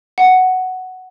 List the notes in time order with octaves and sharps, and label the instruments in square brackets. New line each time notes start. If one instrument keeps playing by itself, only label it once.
[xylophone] F#5